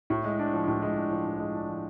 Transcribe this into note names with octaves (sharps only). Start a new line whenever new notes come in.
A2
G#3
D4
F3
A2
G#3
D4
F3
A2
G#3
D4
F3